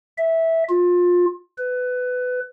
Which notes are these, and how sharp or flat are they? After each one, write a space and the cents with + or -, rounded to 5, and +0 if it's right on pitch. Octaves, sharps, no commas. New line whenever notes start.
E5 -10
F4 +25
B4 +20